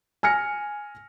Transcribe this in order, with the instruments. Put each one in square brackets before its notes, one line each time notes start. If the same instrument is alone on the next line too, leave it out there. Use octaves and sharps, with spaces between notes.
[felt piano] G#5 F6 A#6 C#7